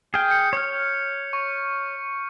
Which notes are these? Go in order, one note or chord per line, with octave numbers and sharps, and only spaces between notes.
G#4 G5 F6 G6
C#7
C#5 F6
C#6